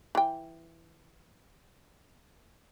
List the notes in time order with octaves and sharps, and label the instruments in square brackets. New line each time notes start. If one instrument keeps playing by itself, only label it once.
[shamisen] E3 G5